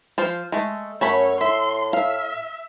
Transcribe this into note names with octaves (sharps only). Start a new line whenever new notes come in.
F3 F4 C5
G#3 A3
F#2 A3 C#4 C#5 B5
A2 E5 C6
E5 F5